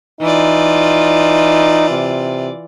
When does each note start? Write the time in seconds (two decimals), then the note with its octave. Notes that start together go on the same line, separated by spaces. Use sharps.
0.21 E3 D#4 F4 D5
1.90 C3